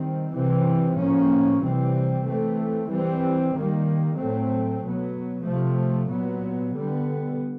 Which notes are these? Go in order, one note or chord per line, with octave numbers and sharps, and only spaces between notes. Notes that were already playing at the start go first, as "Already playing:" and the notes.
Already playing: D#3 G3 C4
C3 E3 G3 C4
A2 F3 A#3 C#4
C3 E3 G3 C4
E3 A3 C4
E3 G3 C4
D#3 G3 A#3
A2 F#3 A3 C4
B2 F#3 B3
C3 F3 A3
A#2 F#3 B3
D3 G3 B3